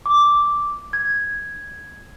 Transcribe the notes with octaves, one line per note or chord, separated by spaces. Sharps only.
D6
G#6